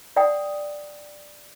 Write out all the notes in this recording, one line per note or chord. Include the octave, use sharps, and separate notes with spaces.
D5 F#5 G5 D#6